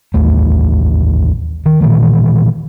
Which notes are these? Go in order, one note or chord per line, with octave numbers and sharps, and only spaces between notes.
A1 D#2 A3
D#3
A#2 D#3 E3 A3